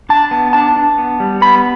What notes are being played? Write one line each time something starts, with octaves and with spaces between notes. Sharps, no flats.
D4 A5
B3
D4 A5
D4
B3
G3
B3 B5